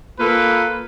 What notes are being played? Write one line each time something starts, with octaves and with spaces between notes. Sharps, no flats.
A#3 F4 A4 B4